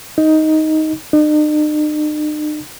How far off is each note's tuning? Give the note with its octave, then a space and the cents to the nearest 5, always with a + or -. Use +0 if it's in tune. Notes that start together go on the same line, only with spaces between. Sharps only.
D#4 +10
D#4 -45